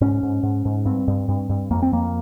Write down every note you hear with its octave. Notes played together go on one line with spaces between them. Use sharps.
G#2 C#4
G#2
G#2
G#2
G2 C4
G2
G2
G2
F2 A#3
C4
F2 A#3